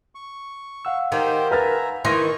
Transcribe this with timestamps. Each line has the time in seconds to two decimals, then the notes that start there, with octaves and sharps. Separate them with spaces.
0.15 C#6
0.85 F5 F#5 E6
1.12 D#3 G4 C5
1.51 B4 E5 G#5 A#5 F6 A6
2.05 D#3 E3 C6 C#6 A#6